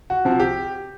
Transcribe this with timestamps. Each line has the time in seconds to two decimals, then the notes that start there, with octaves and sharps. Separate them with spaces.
0.10 F#4
0.25 C3 F3
0.40 G4